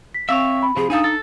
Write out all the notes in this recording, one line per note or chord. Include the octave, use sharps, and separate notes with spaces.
B6
C4 C#5 D5 E5 F5 E6
B5
C3 F3 G#4
D4 D#4 G#4 A4 F5 D#6
A4 A6